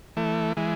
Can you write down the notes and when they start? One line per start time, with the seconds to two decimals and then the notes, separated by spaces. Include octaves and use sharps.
0.17 E3 A3
0.57 E3 G#3